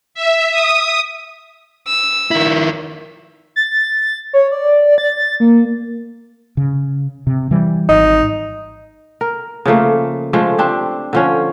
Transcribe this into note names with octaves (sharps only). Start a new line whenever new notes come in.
E5
D#6
E6
D#3 E4
A6
C#5
D5
A6
A#3
C#3
C3
E3 G3
G#1 D#4
A#4
C#3 F3 A3 A#3
F3 G#3 A3
C4 D4 G4
D3 F3 C#4